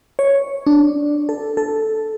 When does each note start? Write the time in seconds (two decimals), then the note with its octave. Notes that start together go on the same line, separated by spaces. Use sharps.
0.19 C#5
0.66 D4
1.29 A4
1.57 A4